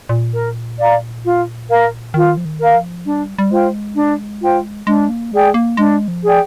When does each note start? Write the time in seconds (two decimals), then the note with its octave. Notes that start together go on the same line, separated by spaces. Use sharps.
0.09 A#2
0.33 A#4
0.78 D5 F5 A#5
1.24 F4
1.68 A#4 F5
2.14 D#3 F4
2.37 F3
2.45 D#3
2.59 A#4 F5
2.75 F3
3.05 G3 D4
3.38 G3
3.50 G#3 F4 C5 G5
3.96 D4
4.42 F4 C5 G5
4.87 G#3 D4
5.09 A#3
5.32 G#3 G#4 D5 G5
5.54 A#3
5.77 G#3 D4
6.08 F3
6.23 G#4 D5 G5